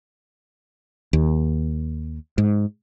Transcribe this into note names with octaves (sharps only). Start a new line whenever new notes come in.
D#2
G#2